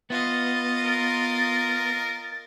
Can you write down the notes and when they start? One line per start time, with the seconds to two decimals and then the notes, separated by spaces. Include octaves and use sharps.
0.10 B3 F4 D#5 A6
0.84 A#4